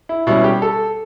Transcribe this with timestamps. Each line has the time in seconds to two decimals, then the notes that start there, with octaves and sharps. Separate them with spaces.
0.09 E4
0.27 B2 G3 C#4 E4
0.44 G4
0.62 A4